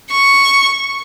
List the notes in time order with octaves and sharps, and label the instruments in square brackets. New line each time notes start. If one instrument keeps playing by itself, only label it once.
[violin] C#6